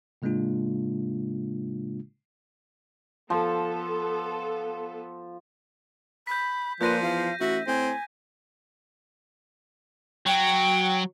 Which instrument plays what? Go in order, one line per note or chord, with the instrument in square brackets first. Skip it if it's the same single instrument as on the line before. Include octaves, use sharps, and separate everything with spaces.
[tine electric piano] A2 C#3 G#3 A#3 D4 F4
[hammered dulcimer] F3 [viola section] B3 A4
[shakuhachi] B5 [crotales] G6 B6
[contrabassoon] A#2 [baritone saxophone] F3 [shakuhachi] B4 [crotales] G6 A#6 D#7
[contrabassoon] E2 [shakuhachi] F5
[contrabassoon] A1 [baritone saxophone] F#4 [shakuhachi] E5
[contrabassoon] A2 [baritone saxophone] C4 [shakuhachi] G#5
[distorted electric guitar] F#3 [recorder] G5